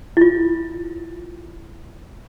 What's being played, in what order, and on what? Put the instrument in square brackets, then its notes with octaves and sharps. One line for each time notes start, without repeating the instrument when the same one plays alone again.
[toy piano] E4 F4